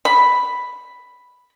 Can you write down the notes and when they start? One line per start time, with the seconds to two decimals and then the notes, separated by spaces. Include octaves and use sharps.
0.05 B5